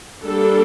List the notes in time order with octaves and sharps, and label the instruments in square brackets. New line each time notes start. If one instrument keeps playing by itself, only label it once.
[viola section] G3 A#3 D4 A4